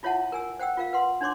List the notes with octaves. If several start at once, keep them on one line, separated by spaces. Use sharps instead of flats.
E4 F4 C#5 E5 F#5 A5
A#4 G#5 E6
C5 F#5 G5 E6
F4 A#4 F5
B4 F#5 C6
D4 D#4 C#5 C6 D6